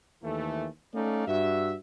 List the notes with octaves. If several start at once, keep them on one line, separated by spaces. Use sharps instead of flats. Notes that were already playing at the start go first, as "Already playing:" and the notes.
D#2 E3 A3
A3 C#4 D#4 D5 F5
G2 F#4 E5